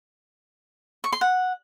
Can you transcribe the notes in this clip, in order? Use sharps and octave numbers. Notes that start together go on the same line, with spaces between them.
C#6
C6
F#5